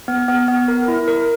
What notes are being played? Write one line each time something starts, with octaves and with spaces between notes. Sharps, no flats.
B3
B3
B3
A#4
E4
A#4